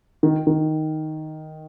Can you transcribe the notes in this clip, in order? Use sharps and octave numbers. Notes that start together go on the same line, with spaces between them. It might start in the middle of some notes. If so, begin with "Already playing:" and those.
D#3
D#3